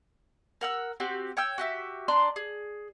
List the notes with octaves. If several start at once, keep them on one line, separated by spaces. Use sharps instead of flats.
A#4 F#5 E6
C4 F#4 G4
C#5 G5 E6
F#4 G4 E5
D4 A#5 C6
G#4